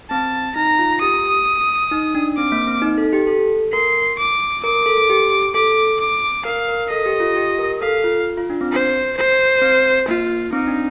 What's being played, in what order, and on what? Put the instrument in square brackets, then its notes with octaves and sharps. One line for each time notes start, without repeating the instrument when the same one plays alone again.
[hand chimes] C4 [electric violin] A5
[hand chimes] D#4 [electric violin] A#5
[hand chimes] F4
[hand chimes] G4 [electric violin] D#6
[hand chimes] D#4
D4
[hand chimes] C4 [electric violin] D6
[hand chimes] A#3
C4
D#4
A4
G4
A4
[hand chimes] A#4 [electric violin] C6
[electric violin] D6
[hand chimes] A#4 [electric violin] D6
[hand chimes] A4
G4
[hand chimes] A4 [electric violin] D6
[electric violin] D6
[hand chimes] A#4 [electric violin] F5
[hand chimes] A#4
[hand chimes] A4 [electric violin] D#5
[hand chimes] G4
F4
G4
A#4
[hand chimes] A4 [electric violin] F5
[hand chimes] F4
F4
D4
C4
[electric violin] C5
C5
[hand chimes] C4
[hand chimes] A#3 [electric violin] F4
[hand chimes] C4 [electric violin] D#4
[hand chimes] D4